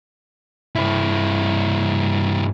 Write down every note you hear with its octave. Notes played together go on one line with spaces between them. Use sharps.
G2 E4